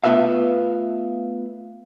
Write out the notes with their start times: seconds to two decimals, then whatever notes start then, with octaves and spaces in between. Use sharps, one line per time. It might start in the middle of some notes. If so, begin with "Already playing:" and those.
0.04 A3 B3 F4 B4 E5 F5